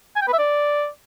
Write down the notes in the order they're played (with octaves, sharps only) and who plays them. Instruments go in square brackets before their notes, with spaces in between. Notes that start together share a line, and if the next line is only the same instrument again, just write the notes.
[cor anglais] G#5
G5
B4
E5
D5